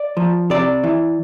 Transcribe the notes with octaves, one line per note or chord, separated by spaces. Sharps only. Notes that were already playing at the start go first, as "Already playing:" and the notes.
Already playing: D5
F3
C3 D5
E3